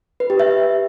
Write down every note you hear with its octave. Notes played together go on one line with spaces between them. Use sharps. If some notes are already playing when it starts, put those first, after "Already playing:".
B4
G4
E5